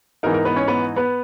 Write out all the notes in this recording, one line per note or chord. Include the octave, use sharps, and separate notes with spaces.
G#2 E3 B3 D#4 A#4
A#4
B3 B4
C#4 C#5
B3 B4
B3 B4